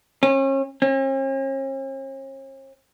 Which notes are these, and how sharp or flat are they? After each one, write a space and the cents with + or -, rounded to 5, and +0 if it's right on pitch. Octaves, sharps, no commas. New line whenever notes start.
C#4 -35
C#4 -45